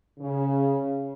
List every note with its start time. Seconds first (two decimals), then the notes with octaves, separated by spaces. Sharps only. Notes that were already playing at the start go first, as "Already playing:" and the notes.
0.19 C#3